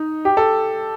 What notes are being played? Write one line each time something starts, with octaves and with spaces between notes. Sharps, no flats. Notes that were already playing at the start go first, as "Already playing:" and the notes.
Already playing: D#4
G4
A4